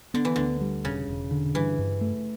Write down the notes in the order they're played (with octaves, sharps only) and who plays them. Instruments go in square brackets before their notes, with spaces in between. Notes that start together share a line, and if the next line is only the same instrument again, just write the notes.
[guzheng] D3 [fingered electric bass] B3
[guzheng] E3
[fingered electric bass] D2 [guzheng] D3
[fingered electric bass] G3
[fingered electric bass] E1 [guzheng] C#3
[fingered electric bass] E1
D3
[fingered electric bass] G2 [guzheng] E3
[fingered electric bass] G2
A3